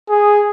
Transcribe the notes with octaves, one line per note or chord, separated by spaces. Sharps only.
G#4